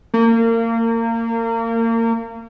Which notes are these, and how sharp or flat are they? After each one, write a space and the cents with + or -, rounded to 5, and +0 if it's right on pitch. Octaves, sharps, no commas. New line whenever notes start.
A#3 -30